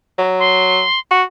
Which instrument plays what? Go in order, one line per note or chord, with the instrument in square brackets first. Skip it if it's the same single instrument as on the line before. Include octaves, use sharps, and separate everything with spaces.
[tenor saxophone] F#3
[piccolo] C6
[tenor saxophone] F#4